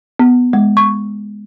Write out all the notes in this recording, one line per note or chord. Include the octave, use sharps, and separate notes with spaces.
B3
G#3
C#6